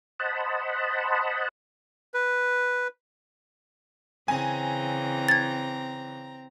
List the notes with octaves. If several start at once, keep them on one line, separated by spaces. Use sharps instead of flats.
C5 D#5 F#5 A5 B5
B4
C#3 E3 C4 G#5 A#5
G#6 A6